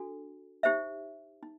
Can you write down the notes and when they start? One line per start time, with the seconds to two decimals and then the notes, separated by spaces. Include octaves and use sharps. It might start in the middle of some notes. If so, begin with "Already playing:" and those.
Already playing: D4 F#4 A4
0.63 D#4 G4 C5 E5
1.43 D#4